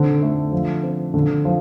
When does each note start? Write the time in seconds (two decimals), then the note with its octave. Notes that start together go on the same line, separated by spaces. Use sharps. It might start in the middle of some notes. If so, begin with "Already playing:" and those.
Already playing: D3 C4
0.22 A3
0.52 F3
0.83 C4
1.14 D3
1.45 F3